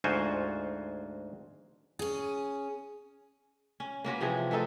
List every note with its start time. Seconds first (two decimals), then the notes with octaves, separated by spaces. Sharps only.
0.04 D2 G#2 F4 F#4 C5 G#5
1.99 C#4 G#4
3.80 C#4
4.05 A#3 C#4 F#4 B4
4.21 C3 E3 F3 G#4
4.51 A3 C4 D#4 A4